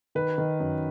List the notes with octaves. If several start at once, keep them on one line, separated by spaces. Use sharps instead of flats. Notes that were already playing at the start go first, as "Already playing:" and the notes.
D#3 B4
D#3
F#2